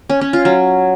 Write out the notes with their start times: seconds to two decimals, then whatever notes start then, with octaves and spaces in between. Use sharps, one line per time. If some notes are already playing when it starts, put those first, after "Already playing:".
0.09 C#4
0.21 C#4
0.33 F4
0.45 F#3